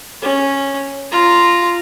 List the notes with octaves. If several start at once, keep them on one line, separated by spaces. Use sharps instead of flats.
C#4
F4 A#5